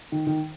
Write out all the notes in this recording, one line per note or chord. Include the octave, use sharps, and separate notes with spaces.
D#3
D#3